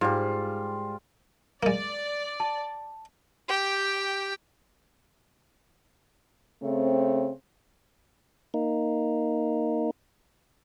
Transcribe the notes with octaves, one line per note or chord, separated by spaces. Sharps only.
G#2 G3 F4
G#3 A#3 D5
A5
G4 G5
C#3 A3 C4
A#3 D#4